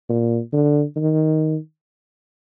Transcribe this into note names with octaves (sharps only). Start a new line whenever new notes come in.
A#2
D3
D#3